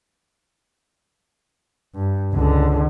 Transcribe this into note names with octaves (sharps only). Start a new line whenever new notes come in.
G2
C#2 D3